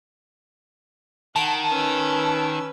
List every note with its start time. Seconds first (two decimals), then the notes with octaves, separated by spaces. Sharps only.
1.36 D#3 F#5 A5
1.72 C#4 B4 E6